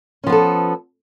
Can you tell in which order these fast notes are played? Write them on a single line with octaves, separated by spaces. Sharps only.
C#4 F3 B3 A4